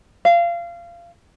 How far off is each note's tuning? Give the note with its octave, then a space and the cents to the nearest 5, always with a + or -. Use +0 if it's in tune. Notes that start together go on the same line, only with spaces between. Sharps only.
F5 -25